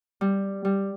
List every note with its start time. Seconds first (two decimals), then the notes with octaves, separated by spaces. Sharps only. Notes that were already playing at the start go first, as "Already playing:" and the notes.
0.21 G3
0.65 G3